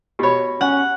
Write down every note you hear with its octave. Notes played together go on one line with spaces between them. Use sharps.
B2 G4 C#5 B5
C#4 F#5